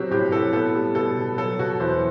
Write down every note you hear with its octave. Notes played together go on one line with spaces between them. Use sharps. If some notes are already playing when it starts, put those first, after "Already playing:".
Already playing: B2 F#3 C4 F#4 G4
A2 G4
A2 A4
B3 A4
G3
B2 A4
B2
F#3 A4
B2 F#4
E2 C5